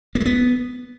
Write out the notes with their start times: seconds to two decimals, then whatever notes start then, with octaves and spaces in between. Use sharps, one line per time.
0.15 A#3
0.20 G#3
0.26 B3